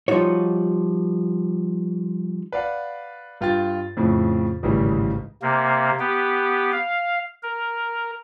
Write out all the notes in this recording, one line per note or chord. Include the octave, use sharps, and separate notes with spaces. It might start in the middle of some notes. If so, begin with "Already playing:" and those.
F3 G3 D#4 F4 F#4 C#5
B4 D5 F5 F#5
G2 F4 G5 A6
F2 A2 C#3
G#1 C#2 A2 C#3 E3 G3
C3 A#3
B3 G4
F5
A#4